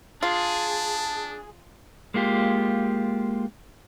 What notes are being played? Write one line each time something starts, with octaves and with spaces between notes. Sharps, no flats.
D4 F4 G#4 A5
G#3 A#3 F4 G4